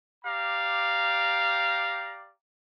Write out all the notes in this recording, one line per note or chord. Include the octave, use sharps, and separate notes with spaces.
G4 D5 F5 A#5